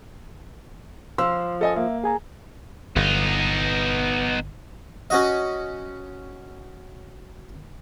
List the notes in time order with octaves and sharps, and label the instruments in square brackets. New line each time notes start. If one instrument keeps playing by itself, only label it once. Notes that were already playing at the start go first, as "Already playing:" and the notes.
[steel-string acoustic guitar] F3 [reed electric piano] C6 [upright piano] E6
[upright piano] A4 D#5 G#5
[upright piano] A#3 [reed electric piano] E5
[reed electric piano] G#4 G#5 A#5
[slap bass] G1 [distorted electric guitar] B3 D#4
[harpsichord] C#4 F#4 D#5